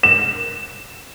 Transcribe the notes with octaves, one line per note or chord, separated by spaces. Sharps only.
E7